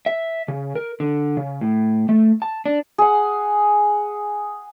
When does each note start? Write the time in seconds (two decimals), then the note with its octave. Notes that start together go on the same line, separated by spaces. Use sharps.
0.06 E5
0.48 C#3
0.75 A#4
1.00 D3
1.37 C#3
1.61 A2
2.09 A3
2.42 A5
2.66 D4
2.98 G#4 F#5